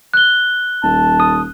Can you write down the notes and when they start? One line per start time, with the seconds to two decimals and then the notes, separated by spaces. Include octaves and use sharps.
0.14 F#6 G7
0.83 D#1 A5
1.20 D#6